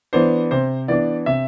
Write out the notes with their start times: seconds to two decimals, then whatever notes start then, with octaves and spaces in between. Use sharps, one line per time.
0.13 E3 B3 D4 C5
0.51 C3 C5
0.88 E3 B3 D4 D5
1.26 C3 E5